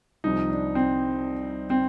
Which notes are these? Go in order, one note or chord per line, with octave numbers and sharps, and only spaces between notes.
C2 C3 F3 D#4
D4
C4
C4